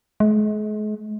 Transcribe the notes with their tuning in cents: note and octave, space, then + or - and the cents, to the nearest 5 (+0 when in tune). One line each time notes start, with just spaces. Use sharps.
G#3 +40